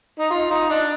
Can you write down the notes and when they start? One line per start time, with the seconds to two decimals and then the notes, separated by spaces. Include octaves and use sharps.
0.19 D#4
0.30 F4
0.51 D#4
0.70 D4